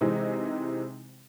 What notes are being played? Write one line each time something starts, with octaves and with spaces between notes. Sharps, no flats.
C3 E3 G#3 C4 D#4